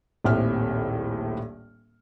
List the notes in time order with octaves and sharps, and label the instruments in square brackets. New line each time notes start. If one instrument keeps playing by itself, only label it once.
[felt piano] D#1 A#1 A2 C4 E5 F6